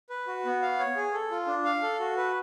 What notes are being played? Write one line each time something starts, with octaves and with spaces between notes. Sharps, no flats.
B4
F#4
B3
F5
C#5
G#4
A4
F4
D4
F5
A4
F#4
B4